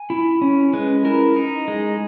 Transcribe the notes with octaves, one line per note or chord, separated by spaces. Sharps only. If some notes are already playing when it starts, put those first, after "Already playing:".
Already playing: G#5
E4
C#4
G#3 B4
E4 A#4
D#4
G#3